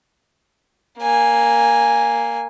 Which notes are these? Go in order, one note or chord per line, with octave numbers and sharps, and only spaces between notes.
A#3 G#5